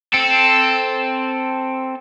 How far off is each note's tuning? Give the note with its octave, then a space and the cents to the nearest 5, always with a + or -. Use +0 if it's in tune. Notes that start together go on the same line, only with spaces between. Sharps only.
C4 +0 A4 +0